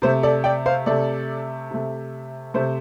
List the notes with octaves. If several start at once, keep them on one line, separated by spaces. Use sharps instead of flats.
C3 A3 C5
A4 D5
D5 G5
C5 F5
C3 A3 A4 D5
C3 A3
C3 A3 C5